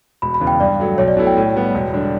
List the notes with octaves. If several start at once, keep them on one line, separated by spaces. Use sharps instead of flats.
E1 B5
B5
E2 C#3 E3
G5
G2 D5
F#3 A3
B1 C#5
D5
B2 A3 E4
G5
A2
G3 B3
E1
D3 G3 D4